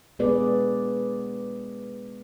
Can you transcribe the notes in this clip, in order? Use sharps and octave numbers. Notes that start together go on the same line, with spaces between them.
G#3 B3 G#4 B4 D5